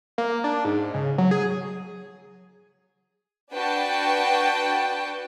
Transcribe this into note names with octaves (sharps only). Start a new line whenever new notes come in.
A#3
D4
G#2
C#3
F#3
G#4
D4 F#4 B4 G5 A5